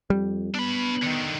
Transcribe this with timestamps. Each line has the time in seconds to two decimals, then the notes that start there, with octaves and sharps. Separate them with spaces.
0.10 F2 G3
0.55 B3 D4 B5
1.02 D3 D#3